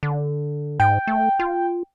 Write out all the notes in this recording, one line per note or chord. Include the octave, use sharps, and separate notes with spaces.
D3
G#2 G5
A3
F4